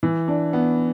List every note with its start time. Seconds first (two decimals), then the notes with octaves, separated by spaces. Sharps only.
0.03 E3
0.28 D4
0.53 B3